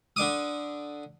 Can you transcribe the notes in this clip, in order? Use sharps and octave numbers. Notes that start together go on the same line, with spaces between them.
D3 D4 D6 D#6